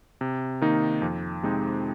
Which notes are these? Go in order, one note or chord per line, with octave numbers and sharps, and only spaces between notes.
C3
D#3 A#3 D#4
F2
C3 G#3 C4 D#4